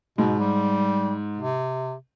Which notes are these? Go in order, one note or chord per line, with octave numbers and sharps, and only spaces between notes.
G#2 B2
G3
C3